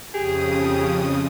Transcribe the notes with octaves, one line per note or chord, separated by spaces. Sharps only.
F2 C#3 G4 G#4 D#6